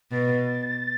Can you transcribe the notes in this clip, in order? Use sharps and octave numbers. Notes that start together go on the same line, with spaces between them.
B2 A6